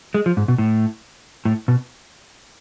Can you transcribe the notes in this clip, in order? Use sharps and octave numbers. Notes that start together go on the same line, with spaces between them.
G#3
F3
G#2
B2
A2
A2
B2